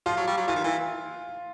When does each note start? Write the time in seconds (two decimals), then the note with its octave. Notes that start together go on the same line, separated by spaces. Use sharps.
0.06 F3 F4
0.17 F#3
0.27 G3
0.37 F#3
0.48 E3 F4
0.56 D#3
0.64 E3